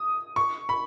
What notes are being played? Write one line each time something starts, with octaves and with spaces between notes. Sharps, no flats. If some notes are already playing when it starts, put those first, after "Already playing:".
Already playing: D#6
C#6
B5